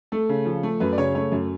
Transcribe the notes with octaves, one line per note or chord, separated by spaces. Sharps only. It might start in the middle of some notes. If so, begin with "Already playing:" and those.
A3 A4
C#3
F3
A3
F#2 B4
D5
C#3 C#5
A3 C#5
F#2